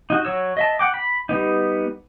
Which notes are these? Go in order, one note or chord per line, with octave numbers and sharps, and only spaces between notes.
D#4 F#4
F#3 C#5 E6
D#5 E5 A5
F#5 G5 D6
B5
G3 B3 D#4